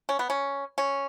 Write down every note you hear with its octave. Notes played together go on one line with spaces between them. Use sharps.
C#4
B3
C#4
C#4